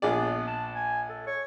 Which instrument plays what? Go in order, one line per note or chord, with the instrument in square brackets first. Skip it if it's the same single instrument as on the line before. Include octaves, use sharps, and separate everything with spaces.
[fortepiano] A#1 G#4 D5 [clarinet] B3
[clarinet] A5
G#5
A4
C#5